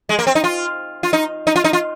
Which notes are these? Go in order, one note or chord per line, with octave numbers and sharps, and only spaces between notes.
G#3
A#3
C4
D#4
F4
F4
D#4
D#4
F4
D#4
F4